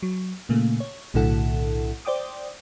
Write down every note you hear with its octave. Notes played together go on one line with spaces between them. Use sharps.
F#3
A#2 C#3 A3 A#3
C#5
B1 A2 D3 E4 A4 F#5
C5 D5 G5 D6 D#6